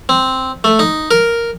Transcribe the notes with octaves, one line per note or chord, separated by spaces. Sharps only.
C4
A3
D#4
A#4